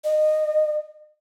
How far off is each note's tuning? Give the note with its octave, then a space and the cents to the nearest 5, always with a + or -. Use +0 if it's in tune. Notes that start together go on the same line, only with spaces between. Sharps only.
D#5 -20